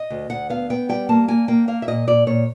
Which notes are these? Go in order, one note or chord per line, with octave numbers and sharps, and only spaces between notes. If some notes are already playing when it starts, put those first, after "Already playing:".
Already playing: D#5
D2
D2 F#5
B3 F5
B3 G5
G3 G5
A#3 A5
A#3 G#5
A#3 G5
A#3 F5
E5
A#2 D#5
A#2 D5
A#2 C#5